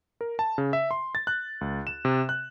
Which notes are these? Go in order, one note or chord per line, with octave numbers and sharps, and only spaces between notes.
A#4
A5
C#3
E5
C6
A6
F#6
C#2
E7
C3
F#6